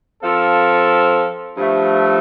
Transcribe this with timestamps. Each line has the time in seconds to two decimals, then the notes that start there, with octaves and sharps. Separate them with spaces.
0.23 F3 C4 F4 A4
1.57 G2 F3 A3